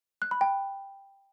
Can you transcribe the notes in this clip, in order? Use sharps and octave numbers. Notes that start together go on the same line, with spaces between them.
F#6
B5
G5